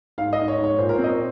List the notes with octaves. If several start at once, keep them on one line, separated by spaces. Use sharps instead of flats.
G#2 F5
D#5
G#2
C#5
G#2
C#5
A#2 C5
A#4
C4 C5
D#5
C#5